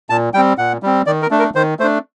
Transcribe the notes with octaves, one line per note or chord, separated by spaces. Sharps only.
A#2 A5
G3 C4 G5
A#2 F#5
G3 C4
D#3 D5
A#4
A3 D4
A#4
D#3 C5
A3 D4 C5